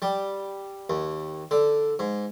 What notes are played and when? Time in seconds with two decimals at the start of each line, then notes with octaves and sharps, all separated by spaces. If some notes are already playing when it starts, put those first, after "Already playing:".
0.02 G3
0.90 D#2
1.51 D3
1.99 G#2